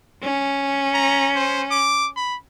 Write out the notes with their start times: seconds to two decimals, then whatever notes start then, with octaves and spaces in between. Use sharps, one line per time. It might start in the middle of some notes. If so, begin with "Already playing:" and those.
0.23 C#4
0.94 A#5
1.36 C5
1.71 D6
2.16 B5